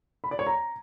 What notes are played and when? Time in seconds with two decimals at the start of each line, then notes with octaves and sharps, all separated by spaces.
0.24 B5
0.31 D5
0.39 C#5
0.47 A#5